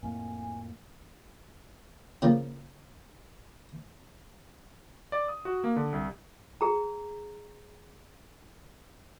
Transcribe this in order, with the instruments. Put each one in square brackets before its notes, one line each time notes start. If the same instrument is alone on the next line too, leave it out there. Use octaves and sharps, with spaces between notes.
[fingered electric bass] F2 A2 A#3 [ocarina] G#5
[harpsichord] C#3 F3 A#3
[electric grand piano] D5
D#6
F#4
A#3
D3
C2
[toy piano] G#4 A#5